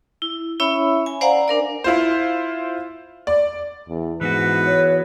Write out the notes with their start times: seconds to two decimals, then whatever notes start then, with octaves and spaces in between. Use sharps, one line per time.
0.22 E4
0.60 C#4 E4 C#5 E5 B5 E6
1.06 G#5
1.21 C5 D5 F5 F#5 G#5 A#5
1.48 D4 A#4 D5
1.84 E4 F4 C5
3.27 D5
3.89 E2
4.21 G#2 E3 B3 F#4 B4
4.66 C#5